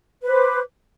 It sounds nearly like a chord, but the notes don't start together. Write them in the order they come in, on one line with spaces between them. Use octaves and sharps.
B4 C5 D6